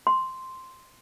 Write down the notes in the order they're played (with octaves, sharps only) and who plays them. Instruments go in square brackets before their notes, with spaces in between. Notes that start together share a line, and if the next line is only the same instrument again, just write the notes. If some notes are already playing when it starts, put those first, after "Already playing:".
[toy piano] C6